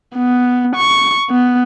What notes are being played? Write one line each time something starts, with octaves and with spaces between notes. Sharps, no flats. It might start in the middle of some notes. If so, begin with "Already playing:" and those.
B3
C#6
B3